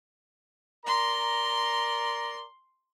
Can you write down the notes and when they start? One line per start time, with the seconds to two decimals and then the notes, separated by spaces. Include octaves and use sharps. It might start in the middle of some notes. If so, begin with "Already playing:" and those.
0.86 A#4 D5 A#5 C6